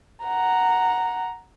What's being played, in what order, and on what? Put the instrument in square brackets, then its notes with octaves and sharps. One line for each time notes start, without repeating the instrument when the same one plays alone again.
[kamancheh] F#5 A#5